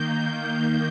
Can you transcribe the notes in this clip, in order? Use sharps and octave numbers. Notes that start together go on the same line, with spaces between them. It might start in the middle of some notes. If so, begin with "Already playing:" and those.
Already playing: D#3 A#3 G6